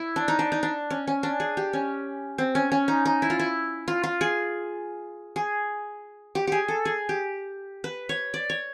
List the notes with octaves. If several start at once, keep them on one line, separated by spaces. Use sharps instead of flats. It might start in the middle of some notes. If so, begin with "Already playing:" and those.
Already playing: E4
D4
D#4
D4
D#4
D4
C#4
C#4
D4
G#4
G4
C#4
C4
C#4
C#4
D#4
D#4
E4
F4
E4
F4
F4
G#4
G#4
G4
G4 G#4
A4
G#4
G4
B4
C#5
D5
C#5